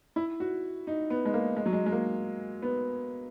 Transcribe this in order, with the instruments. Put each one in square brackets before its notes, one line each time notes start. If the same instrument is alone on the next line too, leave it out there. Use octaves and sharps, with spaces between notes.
[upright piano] E4
F#4
D#4
B3
G#3
A#3
G#3
F#3
G#3
G#3
A#3
B3